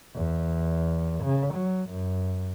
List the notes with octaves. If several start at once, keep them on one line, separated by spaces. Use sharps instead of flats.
E2
C#3
F#3
F#2